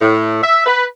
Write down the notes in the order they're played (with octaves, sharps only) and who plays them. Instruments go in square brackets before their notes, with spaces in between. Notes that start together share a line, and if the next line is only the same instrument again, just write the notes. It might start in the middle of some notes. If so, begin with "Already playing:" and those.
[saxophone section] A2
E5
B4